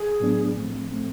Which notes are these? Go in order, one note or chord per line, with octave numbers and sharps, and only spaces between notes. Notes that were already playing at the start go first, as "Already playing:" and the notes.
Already playing: G#4
A2 F#3 B3 D4
A2 F3 A3 C4
A2 F3 A3 C4